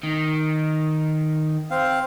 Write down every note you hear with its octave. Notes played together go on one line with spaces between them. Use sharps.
D#3
C4 F5